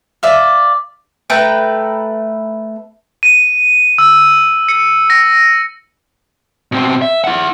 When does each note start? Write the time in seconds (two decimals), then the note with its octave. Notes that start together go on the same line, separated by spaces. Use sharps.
0.23 D5 E5 F5
1.30 A3 B4 G5 A#5
3.23 D#7
3.98 E6
4.69 C#7
5.10 A#6
6.72 B2 C4
7.02 E5
7.24 E4 F#5